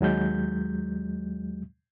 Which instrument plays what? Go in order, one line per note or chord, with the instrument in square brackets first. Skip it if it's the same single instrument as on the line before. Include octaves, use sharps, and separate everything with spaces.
[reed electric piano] D#2 F#3 G#3 G6